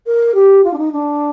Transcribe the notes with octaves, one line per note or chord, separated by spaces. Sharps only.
A#4
G4
F4
D4
D#4
D4